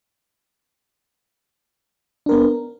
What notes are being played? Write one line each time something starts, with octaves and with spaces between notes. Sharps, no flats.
B3 D4 A#4